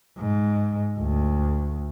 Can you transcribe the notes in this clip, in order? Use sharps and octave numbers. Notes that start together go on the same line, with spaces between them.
G#2
D2